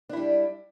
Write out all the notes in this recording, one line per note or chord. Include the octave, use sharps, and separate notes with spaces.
G3 D4 E4